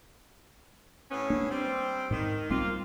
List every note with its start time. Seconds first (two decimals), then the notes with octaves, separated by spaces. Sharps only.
1.10 A2 B3 C#4
1.30 A#3 D4
1.50 G3 C4
2.11 G#2 D#3
2.50 B1 G3 A#3 C4 F4